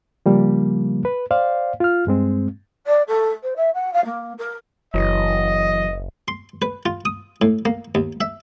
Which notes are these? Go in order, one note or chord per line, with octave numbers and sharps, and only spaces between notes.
C#3 F3 G3 A#3
B4
C5 D5 F5
F4 F6
G2 G#3 C4
D5
A4
C5
E5
F#5
F5
A#3
A#4
F#1 E3 F#3 E4 D#5
C6
B4
F4
D#6
A2
A#3
D#2
E5